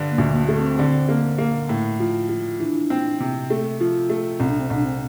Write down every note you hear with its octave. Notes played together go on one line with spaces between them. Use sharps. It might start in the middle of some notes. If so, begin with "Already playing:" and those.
Already playing: G2 D3
A#3
D2
A#3
A3
C4
D3
A#3
A#3
A2
F3
F3
E3 D4
C4
C3
A3
F3
A3
C2 C4
D4
C4
C2 D4
C4